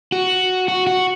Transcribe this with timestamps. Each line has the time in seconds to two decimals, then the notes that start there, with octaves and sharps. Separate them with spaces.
0.12 F#4
0.68 F#4
0.87 F#4